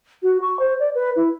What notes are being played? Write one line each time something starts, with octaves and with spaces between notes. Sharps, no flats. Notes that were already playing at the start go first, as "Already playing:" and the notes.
F#4
C#6
C5
D5
B4
E4